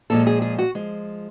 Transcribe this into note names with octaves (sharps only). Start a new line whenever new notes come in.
A#2 F3 G#3 A4
G#4
G#4
F#4
F3 G#3